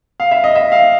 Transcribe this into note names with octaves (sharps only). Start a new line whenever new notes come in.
F5
E5
D#5
E5
F5